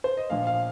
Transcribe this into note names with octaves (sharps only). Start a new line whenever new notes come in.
C5
D#5
A#1 A#2 F3 F5
F5